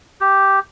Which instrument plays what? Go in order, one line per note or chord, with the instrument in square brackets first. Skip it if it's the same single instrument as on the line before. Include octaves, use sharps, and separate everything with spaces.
[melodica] G4